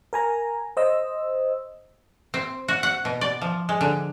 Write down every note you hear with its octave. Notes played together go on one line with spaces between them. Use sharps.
A#4 G#5 A#5
C5 D#5 E6
C4
F#4
F#5
B2
D5
F3
G#3
D3